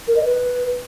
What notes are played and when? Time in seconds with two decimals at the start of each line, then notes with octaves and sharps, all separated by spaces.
0.08 A#4
0.16 D#5
0.25 B4